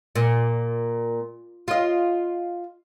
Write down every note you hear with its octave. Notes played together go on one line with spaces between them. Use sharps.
A#2
F4 D#5